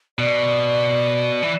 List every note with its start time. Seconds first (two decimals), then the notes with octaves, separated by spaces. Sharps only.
0.19 B2 D5
1.42 E3